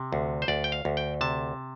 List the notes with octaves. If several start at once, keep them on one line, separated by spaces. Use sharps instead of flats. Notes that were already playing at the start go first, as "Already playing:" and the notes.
Already playing: C3
D2
C5
D2 D5
G5
F5
D2
G5
C3 A5